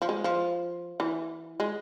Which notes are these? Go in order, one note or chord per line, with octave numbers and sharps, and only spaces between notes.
F3
G#3
F3
E3
G#3